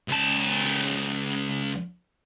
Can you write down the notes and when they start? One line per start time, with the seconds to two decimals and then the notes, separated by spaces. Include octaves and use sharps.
0.08 C#2 A5